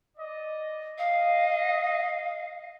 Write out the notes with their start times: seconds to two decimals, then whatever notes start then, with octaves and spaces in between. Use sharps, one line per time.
0.17 D5 D#5
0.98 D#5 F5